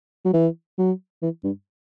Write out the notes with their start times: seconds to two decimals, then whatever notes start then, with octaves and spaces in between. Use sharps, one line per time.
0.25 F#3
0.34 E3
0.78 F#3
1.22 E3
1.44 G2